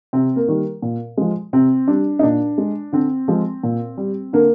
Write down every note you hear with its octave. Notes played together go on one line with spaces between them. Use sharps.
C3 C4
A#3
D#3 G3
A#2
F3 G#3
C3 C4
G3 D4
D#4
A#2 D4
G#3
D3 C4
F3 G#3
A#2
G3
D3 A#3